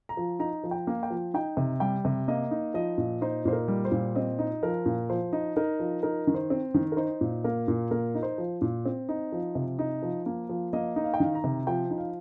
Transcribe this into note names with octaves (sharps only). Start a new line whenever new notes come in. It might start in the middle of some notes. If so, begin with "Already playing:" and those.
A#5
F3
D#4 A#5
F3
G5
A#3
G5
F3
D#4 G5
C3
G3 G5
C3
A#3 D#5
D#4
F3 D#5
A#2
D#4 C5
A#2 C5
A#4
G3
C5
A#2
C4 D#5
D#4
F3 A#4
A#2
F3 C5
D#4
D#4 A#4
F3
D#4 A#4
D#3
C5
C4
D#3
A#4
D#4 C5
A#2
A#3 A#4
A#2
A#3 A#4
D#4
C5
F3
A#2
C4
D#4
F3
C3
D#4
F3
A#3
F3
A#3 D#5
D#4
F5
G5
D#3 F5
A#5
C3
F3 G5
D#4
F5